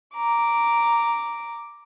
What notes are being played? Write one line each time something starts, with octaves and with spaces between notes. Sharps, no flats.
A#5 D6